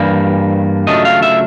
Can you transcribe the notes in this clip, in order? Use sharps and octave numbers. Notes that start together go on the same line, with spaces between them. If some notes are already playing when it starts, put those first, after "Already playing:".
Already playing: G2 E3 G3 A#3
C#3 F#3 A3 D4 F4 D#5
F5
E5